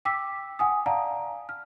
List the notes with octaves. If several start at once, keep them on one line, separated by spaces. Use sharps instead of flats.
G5 D6 E6 B6
F#5 G#5 D#6
D5 F5 F#5 A5 A#5
F6